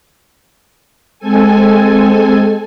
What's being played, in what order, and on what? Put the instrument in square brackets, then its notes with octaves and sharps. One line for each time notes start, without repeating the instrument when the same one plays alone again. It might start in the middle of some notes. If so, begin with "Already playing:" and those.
[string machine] G#3 C4 A4 G#5